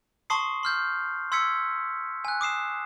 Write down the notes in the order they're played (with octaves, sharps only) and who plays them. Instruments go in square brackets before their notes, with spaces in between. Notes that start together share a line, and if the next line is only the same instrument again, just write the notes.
[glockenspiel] A5 C6 C#6 D#6 C7
C6 F6 G6
C6 E6 G#6 B6 C#7
G#5 F#6
D6 D#6 C7 E7